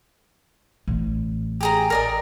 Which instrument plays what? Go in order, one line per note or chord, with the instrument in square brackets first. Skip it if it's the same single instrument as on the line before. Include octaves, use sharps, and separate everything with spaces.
[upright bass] A1
[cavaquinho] G4 G#4 A#5
A#4 D5 D#5